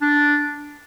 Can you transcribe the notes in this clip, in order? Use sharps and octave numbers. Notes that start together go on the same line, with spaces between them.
D4